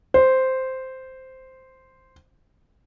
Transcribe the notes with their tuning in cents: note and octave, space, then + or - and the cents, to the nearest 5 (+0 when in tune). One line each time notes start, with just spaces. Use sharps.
C5 -5